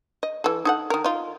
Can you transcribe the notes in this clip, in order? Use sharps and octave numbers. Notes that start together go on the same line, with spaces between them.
D#5
E3 A4
D#4 A4 F#5
D#3 A#4
D#4 F4